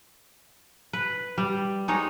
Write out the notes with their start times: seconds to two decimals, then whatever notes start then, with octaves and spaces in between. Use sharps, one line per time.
0.93 B4
1.38 G3
1.88 G#3 D#4 C#5